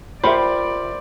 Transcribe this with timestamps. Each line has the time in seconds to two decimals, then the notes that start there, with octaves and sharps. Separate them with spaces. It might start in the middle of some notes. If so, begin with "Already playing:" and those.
0.24 F4 G4 A#4 C5 D5 E5 F#5 B5